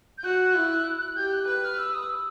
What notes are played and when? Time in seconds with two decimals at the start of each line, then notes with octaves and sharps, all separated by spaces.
0.18 G6
0.24 F#4 F#6
0.55 E4
1.17 G4 G6
1.33 F#6
1.48 B4 F#6
1.63 F6
1.79 E6
1.94 D#6
2.10 E6